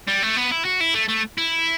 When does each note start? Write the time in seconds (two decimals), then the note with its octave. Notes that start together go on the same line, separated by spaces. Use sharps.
0.07 G3
0.22 A3
0.36 B3
0.51 E4
0.65 F#4
0.81 E4
0.94 A3
1.09 A3
1.38 E4